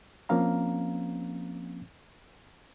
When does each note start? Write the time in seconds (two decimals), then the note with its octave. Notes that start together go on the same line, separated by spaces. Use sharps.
0.29 F3 A#3 C4 C#4 F5 A#5